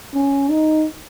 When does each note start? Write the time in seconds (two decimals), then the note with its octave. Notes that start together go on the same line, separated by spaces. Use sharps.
0.15 C#4
0.50 D#4